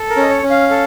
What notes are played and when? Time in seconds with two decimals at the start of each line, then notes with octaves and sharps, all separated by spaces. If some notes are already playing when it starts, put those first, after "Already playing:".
Already playing: A4
0.10 A#4
0.17 C#4 D#5
0.30 C#5
0.43 C#4
0.50 F5
0.70 A4